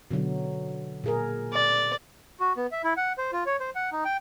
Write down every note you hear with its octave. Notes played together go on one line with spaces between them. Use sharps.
B2 D3 F#3
A#2 G#4 A#4
D5
F#4
B3
E5
E4
F#5
C5
F4
C#5
C5
F#5
D#4
G5